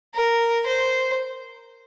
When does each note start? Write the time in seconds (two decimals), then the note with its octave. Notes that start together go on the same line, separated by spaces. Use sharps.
0.15 A#4
0.67 C5